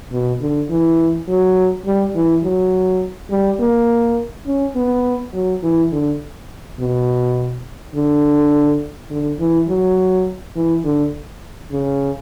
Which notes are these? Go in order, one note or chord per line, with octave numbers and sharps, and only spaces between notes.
B2
D3
E3
F#3
G3
E3
F#3
G3
A#3
C#4
B3
F#3
E3
D3
B2
D3
D3
E3
F#3
E3
D3
C#3